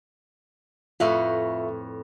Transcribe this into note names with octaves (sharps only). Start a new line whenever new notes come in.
F2 A2 F4 B4 E5 C#6